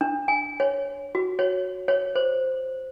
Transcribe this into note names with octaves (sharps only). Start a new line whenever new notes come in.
D4
G#5
C#5
F#4
C#5
C#5
C5